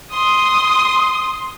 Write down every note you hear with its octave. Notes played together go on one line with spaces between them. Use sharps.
C6 D#6